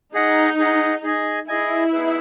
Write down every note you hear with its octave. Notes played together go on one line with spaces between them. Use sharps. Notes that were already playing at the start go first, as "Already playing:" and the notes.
D#4 G#4 D#5 F#5
G#4 D#5 F#5
G#4 D#5 G#5
E4 G#4 D#5 G#5
B3 D#4 G#4 B4